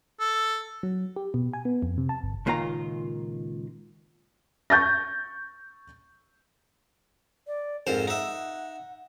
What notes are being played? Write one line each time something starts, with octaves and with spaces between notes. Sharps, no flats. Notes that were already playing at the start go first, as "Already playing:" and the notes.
A4
F#3
G4
B2
G#5
B3
F2
C3
A5
G1
C#2 A#2 D#3 F4 F5 A#5
C#6 G6 A6 A#6
D5
F2 G#2 A#4 C5
D#4 E5 F#5